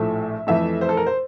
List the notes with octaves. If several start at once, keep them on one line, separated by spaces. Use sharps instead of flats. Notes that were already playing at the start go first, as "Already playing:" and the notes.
Already playing: A#1 A2 F3 A3 E5
F2 E3 A3 E5
C5
A4
A#4
C5